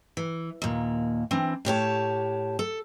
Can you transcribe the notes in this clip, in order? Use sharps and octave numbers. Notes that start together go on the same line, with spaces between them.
E3
D#2 A#2
E3 C4 D4
A2 G4 C#5 A5
A4